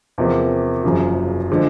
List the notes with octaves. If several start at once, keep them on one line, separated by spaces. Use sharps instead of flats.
E2 C3 F3 A#3
F#1 F#2 C#3 F3
D3 F3 G#3